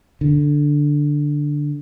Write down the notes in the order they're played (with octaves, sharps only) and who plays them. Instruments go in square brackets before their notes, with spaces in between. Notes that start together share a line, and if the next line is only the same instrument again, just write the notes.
[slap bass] D3